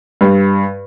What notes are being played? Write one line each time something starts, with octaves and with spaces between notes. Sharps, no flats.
G2